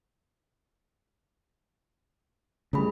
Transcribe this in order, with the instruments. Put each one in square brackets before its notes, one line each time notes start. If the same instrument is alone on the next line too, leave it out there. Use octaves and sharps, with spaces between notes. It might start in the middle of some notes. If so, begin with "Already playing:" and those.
[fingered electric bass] C#3 G3 [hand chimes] A3 G#4 B5